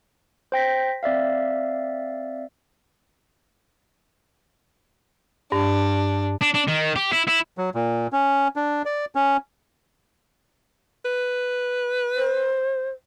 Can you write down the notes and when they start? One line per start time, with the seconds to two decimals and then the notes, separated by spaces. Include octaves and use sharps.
0.52 C5 G5 A#6 B6
1.03 C4 D5 E5 F5
5.52 G2 D4
6.41 D4
6.54 D4
6.68 D#3
6.96 G4
7.13 E4
7.28 E4
7.58 F#3
7.75 A#2
8.13 C#4
8.56 D4
8.85 D5
9.15 C#4
11.05 B4
12.16 C5